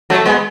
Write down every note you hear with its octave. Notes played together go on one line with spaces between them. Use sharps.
F#3 A3
G#3 B3